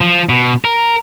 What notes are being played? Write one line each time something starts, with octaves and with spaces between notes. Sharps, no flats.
F3
B2
A#4